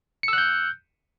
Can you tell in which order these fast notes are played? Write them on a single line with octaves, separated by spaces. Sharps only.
C#7 E6 F#6 G6